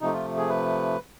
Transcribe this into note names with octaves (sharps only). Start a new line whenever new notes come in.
C3 F3 A3 D#4
F4
G#4
B4